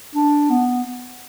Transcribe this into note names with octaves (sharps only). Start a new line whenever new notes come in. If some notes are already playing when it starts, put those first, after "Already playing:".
D4
B3